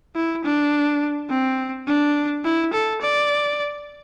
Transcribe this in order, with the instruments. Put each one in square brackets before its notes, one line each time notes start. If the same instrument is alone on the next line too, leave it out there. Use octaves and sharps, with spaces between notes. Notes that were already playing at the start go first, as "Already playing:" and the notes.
[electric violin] E4
D4
C4
D4
E4
A4
D5